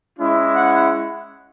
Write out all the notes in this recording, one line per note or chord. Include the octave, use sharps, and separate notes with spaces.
G#3 C#4 E4
F#5